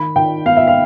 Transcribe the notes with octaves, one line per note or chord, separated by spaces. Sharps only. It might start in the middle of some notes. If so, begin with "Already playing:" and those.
Already playing: D#3 B5
D#3 G5
B3 F5
E5
F5